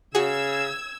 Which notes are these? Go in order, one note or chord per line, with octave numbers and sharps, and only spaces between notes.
C#3 F#4 G#4 E6 G#6